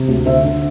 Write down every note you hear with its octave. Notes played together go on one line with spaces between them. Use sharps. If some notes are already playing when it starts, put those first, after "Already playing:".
Already playing: C3
D2
D3 C5 E5
D3